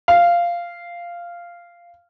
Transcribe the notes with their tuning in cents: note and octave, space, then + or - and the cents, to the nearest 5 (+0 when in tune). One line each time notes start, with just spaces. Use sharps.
F5 -10